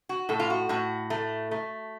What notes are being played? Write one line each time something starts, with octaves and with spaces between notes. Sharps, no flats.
F#4
A2 A4
F4
F#4
A2 F#4
A3
A3